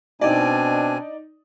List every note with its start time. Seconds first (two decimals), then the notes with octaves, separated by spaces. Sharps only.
0.21 B2 C4 D4 D#4 D5 G#5